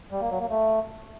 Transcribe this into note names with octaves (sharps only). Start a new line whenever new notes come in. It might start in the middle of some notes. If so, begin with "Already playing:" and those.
G3
A#3
F#3
A#3
A3